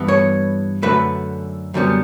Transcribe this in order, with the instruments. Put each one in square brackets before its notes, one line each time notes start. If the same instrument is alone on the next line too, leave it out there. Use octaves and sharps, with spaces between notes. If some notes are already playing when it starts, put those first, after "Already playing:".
Already playing: [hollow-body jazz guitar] G2 E3 B3
C#5
F#2 D3 A3 B4
F#2 D3 G3 B3